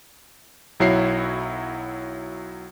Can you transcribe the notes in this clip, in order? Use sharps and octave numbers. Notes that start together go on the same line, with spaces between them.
B1 F#3 E4 F#4 C#5 C7